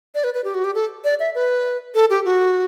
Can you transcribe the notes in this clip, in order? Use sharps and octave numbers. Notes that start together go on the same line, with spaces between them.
D5
B4
B4
G4
F#4
G4
A4
D5
E5
B4
A4
G4
F#4